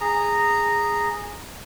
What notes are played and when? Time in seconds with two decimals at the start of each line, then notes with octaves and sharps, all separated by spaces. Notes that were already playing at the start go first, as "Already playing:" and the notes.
0.01 G#4 A#5